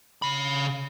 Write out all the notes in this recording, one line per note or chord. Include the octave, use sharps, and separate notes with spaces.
C#3 B5